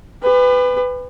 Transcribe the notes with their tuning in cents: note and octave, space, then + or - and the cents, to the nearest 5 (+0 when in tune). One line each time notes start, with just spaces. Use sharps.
G4 +45 B4 +20